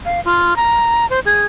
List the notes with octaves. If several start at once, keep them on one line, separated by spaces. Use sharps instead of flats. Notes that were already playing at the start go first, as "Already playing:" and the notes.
F5
F4
A#5
C5
G#4